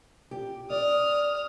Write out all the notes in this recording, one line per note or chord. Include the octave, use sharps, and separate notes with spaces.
G4
D5 D#6 F6